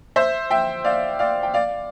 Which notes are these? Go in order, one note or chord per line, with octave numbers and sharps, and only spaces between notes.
C5 E5
E5 G5
D5 F5
D5 F5
G5
D5 F5